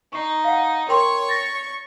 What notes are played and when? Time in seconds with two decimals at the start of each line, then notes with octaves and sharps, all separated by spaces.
0.13 D#4 C#6 C7
0.44 F5 F#5
0.89 A#4 C#5 G5 C6 C#6
1.29 A6 A#6 C#7